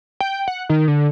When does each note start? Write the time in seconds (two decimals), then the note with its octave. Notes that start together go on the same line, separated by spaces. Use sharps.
0.21 G5
0.48 F#5
0.70 D#3
0.88 D3